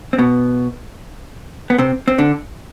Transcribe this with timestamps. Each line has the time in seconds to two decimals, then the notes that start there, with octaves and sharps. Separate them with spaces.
0.13 C4
0.18 B2 B3
1.70 B3
1.78 C3 C4
2.08 C4
2.18 D3 D4